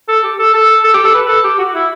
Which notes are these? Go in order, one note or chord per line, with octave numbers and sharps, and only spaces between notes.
A4
G4
A4
A4
A4
G4
A4
B4
A4
G4
F#4
E4